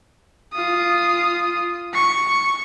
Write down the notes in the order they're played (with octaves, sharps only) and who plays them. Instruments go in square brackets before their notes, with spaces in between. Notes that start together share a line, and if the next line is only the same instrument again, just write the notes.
[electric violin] F4 D#6
C#6